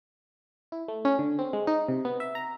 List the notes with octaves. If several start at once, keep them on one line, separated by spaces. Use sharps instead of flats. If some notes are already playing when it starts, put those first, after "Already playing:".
E4
A3
C#4
D3
C4
G#3
D#4
C3
B3
E5
A#5